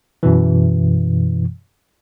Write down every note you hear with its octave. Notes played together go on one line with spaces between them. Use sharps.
F#2 B2 E3